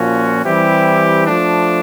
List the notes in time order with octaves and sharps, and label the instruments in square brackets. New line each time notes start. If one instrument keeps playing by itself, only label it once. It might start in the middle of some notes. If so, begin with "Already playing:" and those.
Already playing: [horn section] A#2 F3 A#3 C#4 F#4
E3 G3 C4 E4 G4
F3 A3 D4